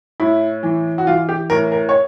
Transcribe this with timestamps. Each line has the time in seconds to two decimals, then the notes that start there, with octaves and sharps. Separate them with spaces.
0.20 A2 E4
0.63 E3
0.98 F#4
1.07 E3 F4
1.29 G4
1.50 A2 A#4
1.72 A#4
1.89 C#5